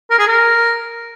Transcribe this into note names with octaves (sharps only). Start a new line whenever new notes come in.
A#4
G#4
A#4